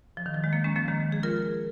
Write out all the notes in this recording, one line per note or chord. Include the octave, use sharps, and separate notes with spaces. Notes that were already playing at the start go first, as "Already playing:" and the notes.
F3
D#3
F3
D#3 G#3
F3 A#3
G#3 C#4
F3 A#3
D#3 G#3
G#4
F4 A#4